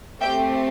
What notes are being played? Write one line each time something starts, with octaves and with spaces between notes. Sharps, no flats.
A3 C4 G4 E5 G5